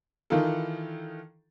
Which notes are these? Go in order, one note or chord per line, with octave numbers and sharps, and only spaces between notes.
D#3 E3 D#4 F4 A4